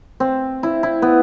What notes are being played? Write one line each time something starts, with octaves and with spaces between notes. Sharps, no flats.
C4
E4
E4
B3